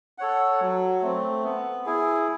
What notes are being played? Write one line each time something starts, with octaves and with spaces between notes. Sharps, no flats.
A4 C#5 F#5
F#3
A3 C4
B3
E4 G#4